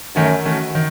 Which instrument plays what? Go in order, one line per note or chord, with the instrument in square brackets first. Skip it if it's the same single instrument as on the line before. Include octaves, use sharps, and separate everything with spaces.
[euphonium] F#2 [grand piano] D#3 A3 C#4 F#4
[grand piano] D#3 A3 C#4 F#4
D#3